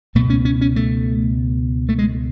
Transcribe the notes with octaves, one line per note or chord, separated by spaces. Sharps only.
C#2 B2 A3
C#4
C#4
C#4
A3
A3
G#3